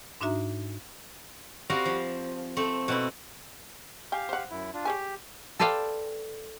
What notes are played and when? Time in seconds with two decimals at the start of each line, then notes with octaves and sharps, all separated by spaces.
0.21 G#2 D4 D#4 F#4 E5 A#5
1.70 G3 C4 F#4 A#4 F5
1.86 F3
2.57 A3 C4
2.88 B2 C4 E4
4.12 G4 F5 G5 G#5
4.29 C5 F#5
4.50 F#2 E4
4.73 D4 F4
4.85 G4 G#4 C#5 G#5
5.59 A4 B4 C5 D5 F5 G5